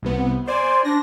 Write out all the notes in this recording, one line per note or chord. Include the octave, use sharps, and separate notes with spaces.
C2 C3 B3
C5 D5 G#5 C6
D4 A#6